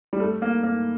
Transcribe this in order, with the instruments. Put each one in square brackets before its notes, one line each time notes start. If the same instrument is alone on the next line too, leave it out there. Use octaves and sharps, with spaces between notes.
[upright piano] G3
A3
A#3
A#3